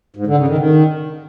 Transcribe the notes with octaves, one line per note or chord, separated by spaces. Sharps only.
G#2
D3
C#3
D#3
D#3